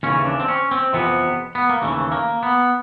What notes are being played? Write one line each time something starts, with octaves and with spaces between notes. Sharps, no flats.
D#2 C#3 E3 C#4
D4
C4
C#4
C4
F2 C3 E3 B3
B3
A#3
D#2 C#3 E3 A3
A#3
B3